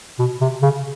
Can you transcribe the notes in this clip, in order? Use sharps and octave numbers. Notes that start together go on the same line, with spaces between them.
B2
C3
C#3